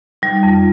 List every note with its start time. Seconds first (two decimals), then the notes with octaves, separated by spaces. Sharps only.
0.22 G3 D#4
0.43 F2
0.54 F4